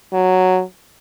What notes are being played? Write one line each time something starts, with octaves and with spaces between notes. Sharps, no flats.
F#3